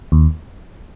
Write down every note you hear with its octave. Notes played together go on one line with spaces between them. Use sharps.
D#2